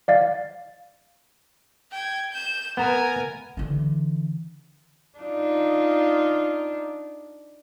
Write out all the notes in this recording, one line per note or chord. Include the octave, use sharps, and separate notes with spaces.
D5 F5 A6
G5 G#6
G6 E7
B3 A#4 G#5 A#5
D3 E3
D4 D#4 F4